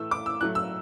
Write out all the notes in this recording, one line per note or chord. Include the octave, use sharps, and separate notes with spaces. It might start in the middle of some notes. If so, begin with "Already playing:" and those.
Already playing: A2 E3 A3 E6
D6
E6
A2 F#3 A3 F#6
E6